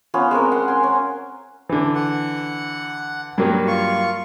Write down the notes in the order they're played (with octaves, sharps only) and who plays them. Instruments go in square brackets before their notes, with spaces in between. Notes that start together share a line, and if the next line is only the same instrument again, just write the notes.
[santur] B3 C#4 F4
G#3 C4 C#4 A#4
F#5 C6
G#5 C6
C#4
[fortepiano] D3 E3
[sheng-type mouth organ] F#5
[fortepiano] G2 F#3 A#3
[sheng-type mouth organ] F4 C#6